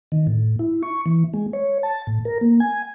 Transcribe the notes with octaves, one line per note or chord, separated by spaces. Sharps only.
D#3
A2
E4
C#6
E3
G#3
C#5
A5
A2
A#4
A#3
G#5